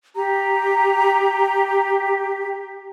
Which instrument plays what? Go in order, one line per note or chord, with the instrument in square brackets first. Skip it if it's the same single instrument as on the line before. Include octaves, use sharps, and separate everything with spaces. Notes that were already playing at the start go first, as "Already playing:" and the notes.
[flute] G4 [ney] A#5